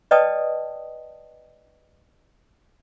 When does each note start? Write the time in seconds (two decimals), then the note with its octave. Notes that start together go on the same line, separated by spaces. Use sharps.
0.11 B4 D5 D#5 G5 A5 D#6